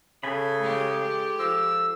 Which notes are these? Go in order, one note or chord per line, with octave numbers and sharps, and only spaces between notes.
C#3 A4 G#5 B5
G#3 G4
F3 E6